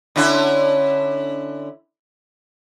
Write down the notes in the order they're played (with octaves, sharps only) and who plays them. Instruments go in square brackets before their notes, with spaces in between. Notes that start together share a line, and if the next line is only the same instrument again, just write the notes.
[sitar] D3 C#4 E4